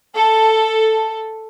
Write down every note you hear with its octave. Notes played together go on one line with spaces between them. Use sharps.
A4